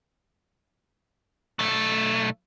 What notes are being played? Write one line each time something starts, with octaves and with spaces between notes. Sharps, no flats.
B1 A3